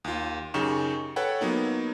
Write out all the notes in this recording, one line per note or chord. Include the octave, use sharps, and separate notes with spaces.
D#2 F4
F#2 C#3 D#4 G4 C#6 E7
A4 B4 C#5 F#5 G5
F#3 A#3 B3 D#4